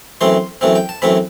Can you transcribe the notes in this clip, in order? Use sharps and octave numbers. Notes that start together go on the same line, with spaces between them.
F#2 E3 A3 C4 C6
F#2 E3 A3 C4
G5
A5
F#2 E3 A3 C4 B5